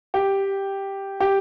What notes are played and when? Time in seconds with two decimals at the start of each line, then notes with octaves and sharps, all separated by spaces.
0.14 G4
1.20 G4